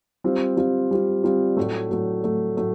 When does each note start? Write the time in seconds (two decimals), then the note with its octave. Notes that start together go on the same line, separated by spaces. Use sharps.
0.24 G3 C4 F4
0.57 G3 C4 F4
0.91 G3 C4 F4
1.24 G3 C4 F4
1.57 A2 F#3 A3
1.91 A2 F#3 A3
2.23 A2 F#3 A3
2.57 A2 F#3 A3